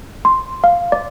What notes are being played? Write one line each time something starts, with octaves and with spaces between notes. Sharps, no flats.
C6
F5
D5